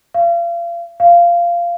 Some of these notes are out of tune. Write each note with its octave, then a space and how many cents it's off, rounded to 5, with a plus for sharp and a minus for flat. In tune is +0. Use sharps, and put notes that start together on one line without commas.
F5 -35
F5 -15